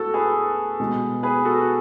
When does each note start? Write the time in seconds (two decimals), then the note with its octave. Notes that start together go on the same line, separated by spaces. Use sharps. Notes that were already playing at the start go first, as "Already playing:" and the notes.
Already playing: A2 G#3 B3 F#4 A4
0.14 G#4 B4
0.80 B2 G#3 B3
1.23 G#4 B4
1.45 F#4 A4